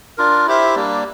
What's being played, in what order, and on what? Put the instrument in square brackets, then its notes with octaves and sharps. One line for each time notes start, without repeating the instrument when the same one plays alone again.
[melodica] D4 F4 A#4
E4 G4 C5 E5
G3 A#3 D4